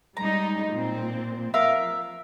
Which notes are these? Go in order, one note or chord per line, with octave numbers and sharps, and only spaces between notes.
G3 G#3 D#4 A#5
A#2 C4
F3 A#4 E5 F5